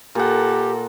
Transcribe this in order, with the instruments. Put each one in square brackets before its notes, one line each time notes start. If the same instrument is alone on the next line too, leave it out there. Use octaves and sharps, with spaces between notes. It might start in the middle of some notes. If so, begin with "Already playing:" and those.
[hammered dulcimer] A#2 F#5 [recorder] G4 [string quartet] A4 A#4